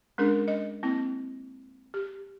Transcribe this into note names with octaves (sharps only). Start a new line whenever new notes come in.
G#3 C#4 D4 G#4 A#4
D#5
A#3 C4 E4
G4